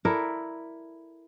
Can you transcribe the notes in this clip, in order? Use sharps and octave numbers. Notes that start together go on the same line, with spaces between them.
E4 A4 A#4 D5